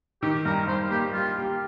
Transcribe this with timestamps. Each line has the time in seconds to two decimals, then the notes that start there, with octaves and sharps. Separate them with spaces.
0.22 D#3 G4
0.46 G2 A#4
0.67 G2 C5
0.90 A#3 G4
1.13 G3 F4
1.36 G4